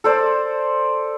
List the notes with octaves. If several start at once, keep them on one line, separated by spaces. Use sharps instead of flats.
A4 C5 D5